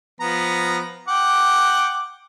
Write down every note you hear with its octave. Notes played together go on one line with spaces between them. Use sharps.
F3 B3 A#5
F#5 G5 D6